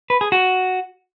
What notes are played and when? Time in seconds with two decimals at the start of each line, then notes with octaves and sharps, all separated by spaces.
0.10 B4
0.21 G#4
0.32 F#4